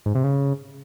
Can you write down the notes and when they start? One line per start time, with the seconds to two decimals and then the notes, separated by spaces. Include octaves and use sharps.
0.06 G#2
0.15 C3
0.24 C#3